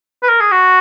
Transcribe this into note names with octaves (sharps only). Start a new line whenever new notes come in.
B4
A#4
G#4
F#4